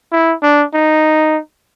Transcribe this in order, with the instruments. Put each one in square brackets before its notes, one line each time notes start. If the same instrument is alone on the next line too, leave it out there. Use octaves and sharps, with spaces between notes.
[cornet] E4
D4
D#4